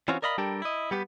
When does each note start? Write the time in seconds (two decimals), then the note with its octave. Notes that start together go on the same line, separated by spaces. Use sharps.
0.08 E3 C4 C#4 F4 F#4
0.22 A#4 D5 D#5 F5 B5
0.38 G3 D4 G4 A4 A#4 D5
0.62 E4 D#5
0.91 G3 B3 G4 B4